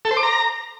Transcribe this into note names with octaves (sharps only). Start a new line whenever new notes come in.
A4
C5
D6
A#5